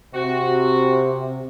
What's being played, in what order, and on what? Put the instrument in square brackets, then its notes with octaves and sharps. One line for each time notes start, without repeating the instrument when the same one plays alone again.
[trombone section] C3 [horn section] F#4